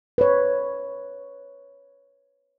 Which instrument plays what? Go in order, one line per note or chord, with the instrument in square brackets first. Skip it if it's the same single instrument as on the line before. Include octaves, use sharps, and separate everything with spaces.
[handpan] B4 C#5